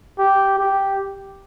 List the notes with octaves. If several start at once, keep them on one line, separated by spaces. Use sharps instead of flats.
G4
G4